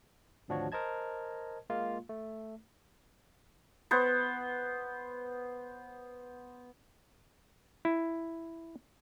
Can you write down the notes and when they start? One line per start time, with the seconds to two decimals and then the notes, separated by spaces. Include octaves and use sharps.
0.48 G#1 D2 F3 D4 F#4 C#5
0.72 A#4 C5 D#5 A5 G#6
1.70 G#3 A#3 F4 F5
2.09 A3
3.91 B3 C5
7.85 E4